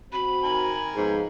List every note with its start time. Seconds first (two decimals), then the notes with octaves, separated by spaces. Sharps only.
0.13 C4 F#4 B5
0.43 D#3 A#4 G#5
0.96 G#2 F3 B3